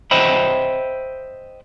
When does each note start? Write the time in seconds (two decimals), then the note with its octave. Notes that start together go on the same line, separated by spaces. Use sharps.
0.11 C5 D#5 E5 G5 B5